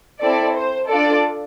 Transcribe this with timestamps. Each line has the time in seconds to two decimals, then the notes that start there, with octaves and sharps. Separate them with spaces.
0.20 C4 E4 A4 D5
0.54 C5
0.88 D4 F4 A4 D5